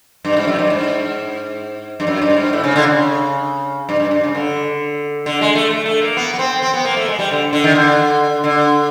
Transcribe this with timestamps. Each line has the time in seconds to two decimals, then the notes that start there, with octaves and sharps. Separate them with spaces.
0.25 G2
0.37 G#2
0.47 F#2
0.59 G2
0.70 G#2
2.00 G2
2.07 F#2
2.22 G2
2.37 G#2
2.53 A2
2.64 C#3
2.76 D3
2.86 C#3
3.89 G2
4.00 G2
4.11 G2
4.24 C#3
4.35 D3
5.26 D3
5.41 G#3
5.55 A3
5.71 A3
5.86 A3
6.02 A#3
6.17 B3
6.34 B3
6.39 C4
6.62 C4
6.74 B3
6.85 A#3
6.97 A3
7.08 G#3
7.19 G3
7.31 D3
7.53 D3
7.64 D#3
7.75 D3
8.44 D3